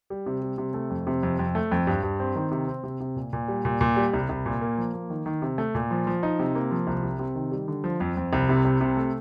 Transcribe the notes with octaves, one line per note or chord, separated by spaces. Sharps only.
G3
C3
G3
C3
A3
F2
C3
F2
F2
A3
F2
G2
G2
C4
D#3
C3
C4
C3
C3
A#2
A#2
G3
A#2
A#2
G3
C2
C2
A#2
A#3
F3
A#3
D#3
D#3
C3
A3
A#2
F3
F3
D#4
C3
A#3
F3
C2
C3
C3
D#3
G3
D3
F3
F2
F2
C2
C3
C2
C3
A3